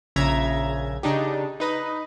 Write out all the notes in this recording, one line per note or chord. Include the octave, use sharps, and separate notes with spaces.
A#1 C#3 E5 A#5 G#6
C#3 D4 D#4 G4
D#4 B4 D#5